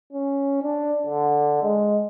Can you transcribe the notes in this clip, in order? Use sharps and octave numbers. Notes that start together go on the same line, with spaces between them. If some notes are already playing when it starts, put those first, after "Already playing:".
C#4
D4
D3
G#3